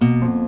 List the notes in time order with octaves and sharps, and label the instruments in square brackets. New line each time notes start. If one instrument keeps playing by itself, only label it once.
[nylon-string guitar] B2 [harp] A#3
[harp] F2